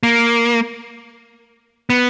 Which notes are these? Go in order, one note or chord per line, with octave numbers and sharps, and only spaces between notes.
A#3
B3